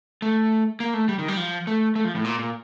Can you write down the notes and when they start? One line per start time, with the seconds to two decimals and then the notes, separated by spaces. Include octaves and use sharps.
0.22 A3
0.80 A#3
0.94 A3
1.09 G3
1.19 D#3
1.28 G3
1.37 F3
1.67 A3
1.96 A3
2.05 F3
2.15 A2
2.24 A#2
2.39 A#2